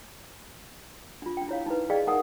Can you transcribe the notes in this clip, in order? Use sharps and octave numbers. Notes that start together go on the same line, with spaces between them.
D4 F4
D4 G5
E4 C#5 F5
D#4 E4 B4
G#4 D5 D#5 F5 G5
D#4 A#4 F#5 G#5 D#6